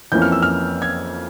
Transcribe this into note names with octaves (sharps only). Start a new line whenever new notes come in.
F2 E3 A#3 C#4 G6
F6
E6
F6
G#6